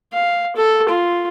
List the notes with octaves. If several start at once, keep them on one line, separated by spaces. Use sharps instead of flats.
F5
A4
F4